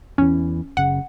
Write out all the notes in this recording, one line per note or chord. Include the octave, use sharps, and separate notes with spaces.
E2 E3 C#4
F#1 C#3 F#5